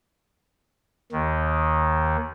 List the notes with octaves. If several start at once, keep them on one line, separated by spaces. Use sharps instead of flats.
D#2 D#3